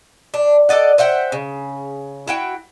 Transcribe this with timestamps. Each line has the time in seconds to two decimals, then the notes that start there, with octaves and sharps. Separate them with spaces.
0.34 D4
0.69 A4 D5 D#5 F#5
0.98 C5 E5 F#5 G5
1.32 C#3
2.27 E4 F#4 G5